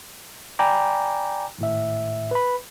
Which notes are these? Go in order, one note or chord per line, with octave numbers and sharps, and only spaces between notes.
D5 G5 G#5 A#5 B5 D6
G#1 A2 E5
B4 B5